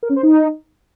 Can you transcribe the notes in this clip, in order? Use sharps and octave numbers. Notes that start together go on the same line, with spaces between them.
A#4
C#4
C5
D#4